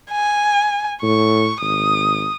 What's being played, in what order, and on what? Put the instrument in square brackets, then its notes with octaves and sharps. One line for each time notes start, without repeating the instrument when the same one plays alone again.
[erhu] G#5
[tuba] A2 [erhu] C#6
[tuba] G#1 [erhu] D#6